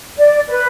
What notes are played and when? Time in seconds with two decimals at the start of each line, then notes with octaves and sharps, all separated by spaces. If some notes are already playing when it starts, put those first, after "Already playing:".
0.17 D5
0.48 B4